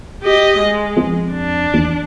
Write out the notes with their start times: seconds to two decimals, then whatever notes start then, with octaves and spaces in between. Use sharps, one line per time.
0.23 G4 D#5
0.59 G#3
0.97 F2
1.32 D4
1.74 E2